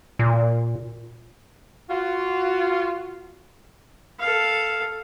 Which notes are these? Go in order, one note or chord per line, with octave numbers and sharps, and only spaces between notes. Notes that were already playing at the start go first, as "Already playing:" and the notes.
A#2
F4 F#4
A4 F5